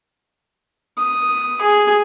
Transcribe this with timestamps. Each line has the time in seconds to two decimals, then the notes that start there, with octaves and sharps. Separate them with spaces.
0.98 D#6
1.61 G#4